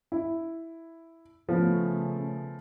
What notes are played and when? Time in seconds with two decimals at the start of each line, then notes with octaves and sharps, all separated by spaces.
0.12 E4
1.49 C#3 F3 A3 B3